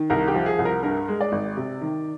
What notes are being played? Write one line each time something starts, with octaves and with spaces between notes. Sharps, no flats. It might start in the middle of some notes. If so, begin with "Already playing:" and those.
Already playing: D#3
C2 A#4
G4
F3
G#4
C2
A#4
G2 A#4
G#3
D5
G#1
C3
D#3